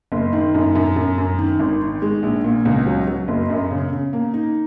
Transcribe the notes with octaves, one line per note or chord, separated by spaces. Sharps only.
F#1
D#3
F#2
F#2
F#2
F#2
D#3
G#1
D#3
G#3
A#1
A#2
C#2
F#3
F#3
F#1
F#2
C#3
C#3
A#3
D#4